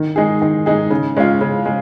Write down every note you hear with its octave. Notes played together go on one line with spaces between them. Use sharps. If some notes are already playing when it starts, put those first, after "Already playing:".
Already playing: D#3
G#3 D#4 G#4
D#3
G#3 D#4 G#4
C#3
G#3 C#4 F4
C#3
G#3